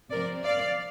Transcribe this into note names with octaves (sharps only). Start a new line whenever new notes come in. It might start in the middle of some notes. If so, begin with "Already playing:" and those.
C3 F3 C4 A#4 D5
D5 F5